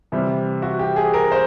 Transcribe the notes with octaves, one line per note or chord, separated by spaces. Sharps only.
C3 E3 G3
F#4
G4
G#4
A#4
C5